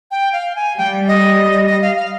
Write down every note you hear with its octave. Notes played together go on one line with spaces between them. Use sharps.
G5
F5
G#5
G3 G5
D#5
D#5
F5
F5